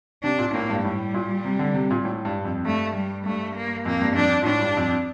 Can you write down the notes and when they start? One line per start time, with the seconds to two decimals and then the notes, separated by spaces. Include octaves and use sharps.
0.23 C3 D4
0.38 A#2
0.54 A2 A#3
0.70 G2
0.84 A2 G3
1.14 A#2
1.45 C3
1.59 D3
1.74 C3
1.90 A#2
2.05 A2
2.25 G2
2.45 F2
2.65 G2 A3
2.96 G3
3.26 G2 A3
3.56 A#3
3.85 F2 A#3
4.02 G2
4.16 F2 D4
4.42 A#2
4.46 A2 D4
4.61 G2
4.77 F2